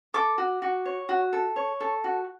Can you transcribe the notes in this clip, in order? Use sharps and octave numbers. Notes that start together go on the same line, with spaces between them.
A4 D6
F#4
F#4
C#5
F#4
A4
C#5
A4
F#4